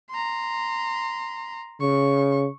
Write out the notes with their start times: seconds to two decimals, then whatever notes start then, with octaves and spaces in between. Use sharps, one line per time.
0.11 A#5 C6
1.81 C#3 C#6